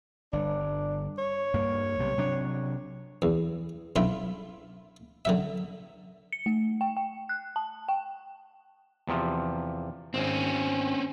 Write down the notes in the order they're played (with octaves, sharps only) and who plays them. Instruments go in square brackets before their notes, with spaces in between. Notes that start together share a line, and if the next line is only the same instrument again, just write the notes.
[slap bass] G1 [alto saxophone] D4
[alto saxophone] C#5
[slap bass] G2 A#3
B1 C3
C3 F#3 D4
[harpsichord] E2
B1 D4 E4 F4 E5
D3 F#3 E5
[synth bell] C#7
A3
G5
G5
F#6
A5
G5
[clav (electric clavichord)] E2 C3 F3
[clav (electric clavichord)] G#1 [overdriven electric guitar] C4 C#4